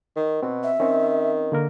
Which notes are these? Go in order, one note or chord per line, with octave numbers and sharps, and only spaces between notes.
D#3
B2 C4
E5
D#3 C4 C#4
D3 A#3 A#4